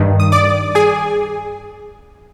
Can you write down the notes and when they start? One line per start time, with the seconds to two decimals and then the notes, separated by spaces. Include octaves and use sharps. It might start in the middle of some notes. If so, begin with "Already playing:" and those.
Already playing: G2 D#3
0.20 D#6
0.32 D5 D6
0.75 G#4 G#5